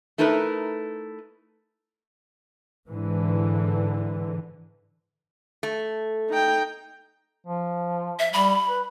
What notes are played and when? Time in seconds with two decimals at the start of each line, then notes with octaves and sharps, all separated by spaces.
0.18 A3 D#4 E4 A#4 B4
2.88 G#2 D3 E3
5.63 A3
6.29 D#4 G5
7.47 F3
8.19 E5
8.33 G3 B5
8.68 B4